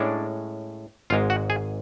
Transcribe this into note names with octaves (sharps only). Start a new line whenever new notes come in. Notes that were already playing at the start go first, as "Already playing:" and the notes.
Already playing: A2 G#3 C#4 D4 D5
G#1 G#2 G#3 F4 F5
F#4 F#5
G#4 G#5